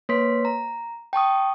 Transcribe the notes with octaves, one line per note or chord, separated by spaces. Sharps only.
A#3 B4 C#5 C6 B6
A#5
G5 A5 C#6 D#6